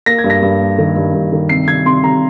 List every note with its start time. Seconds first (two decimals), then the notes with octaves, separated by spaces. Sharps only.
0.06 A#3 A#6
0.18 G#6
0.24 G2
0.30 A#6
0.42 G2
0.60 A#3
0.78 D#3
0.96 G2
1.14 G2
1.33 D#3
1.49 C3 C7
1.68 C3 G#6
1.86 C3 C6
2.04 C3 A#5